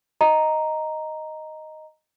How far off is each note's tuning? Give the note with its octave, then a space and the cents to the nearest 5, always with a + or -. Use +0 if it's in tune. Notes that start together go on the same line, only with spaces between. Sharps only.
D#5 +0 A#5 +0